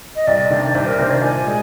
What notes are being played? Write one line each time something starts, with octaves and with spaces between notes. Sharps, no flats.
D#5
C2 D5
C3 D#3 A#3 D4
C2 C5
A#4
C3 D#3 A#3 D4 C5
D5
A#2 G#5
G#3